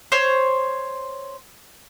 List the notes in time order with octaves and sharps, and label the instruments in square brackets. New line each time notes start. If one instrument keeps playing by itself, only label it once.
[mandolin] C5 C#5